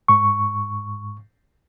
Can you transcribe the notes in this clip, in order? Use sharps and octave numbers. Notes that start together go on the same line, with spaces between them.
G#2 C#6